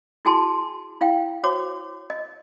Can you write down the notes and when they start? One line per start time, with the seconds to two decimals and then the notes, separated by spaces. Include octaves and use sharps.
0.25 E4 F#4 G#4 G#5 A5 C6
1.01 E4 F5 G5
1.43 F#4 C5 C#5 D6
2.10 D#5